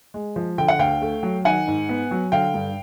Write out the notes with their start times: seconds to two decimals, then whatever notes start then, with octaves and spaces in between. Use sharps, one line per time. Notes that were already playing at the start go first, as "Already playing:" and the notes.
0.14 G#3
0.36 F3
0.58 D3 G5
0.68 F#5
0.79 D2 F5 G5
1.02 A3
1.23 F#3
1.45 D#3 F#5 G#5
1.67 G#2
1.89 B3
2.11 F#3
2.32 D3 F5 G5
2.54 G2